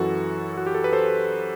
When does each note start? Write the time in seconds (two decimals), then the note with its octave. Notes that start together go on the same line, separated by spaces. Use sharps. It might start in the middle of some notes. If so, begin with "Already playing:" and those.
Already playing: F#2 E3 F#4 A4
0.57 F#4
0.66 G4
0.74 A4
0.84 B4
0.93 A4 C5